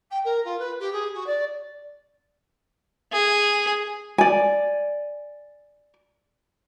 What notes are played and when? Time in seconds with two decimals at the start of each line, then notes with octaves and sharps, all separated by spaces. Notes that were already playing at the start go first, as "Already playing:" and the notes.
0.11 G5
0.24 A#4
0.44 F4
0.59 B4
0.79 G4
0.92 G#4
1.14 F#4
1.26 D5
3.12 G#4
4.18 D5 G#5